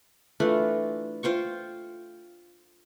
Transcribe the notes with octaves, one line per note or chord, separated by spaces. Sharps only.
E3 A3 D4 F4
F4 C5 G5 C#6